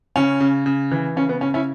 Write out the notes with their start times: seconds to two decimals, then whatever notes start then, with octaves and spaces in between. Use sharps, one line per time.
0.16 C#3 C#4
0.40 C#3
0.66 C#3
0.92 E3
1.16 C#3 C#4
1.29 B3
1.41 C#3 C#4
1.54 C#4 E4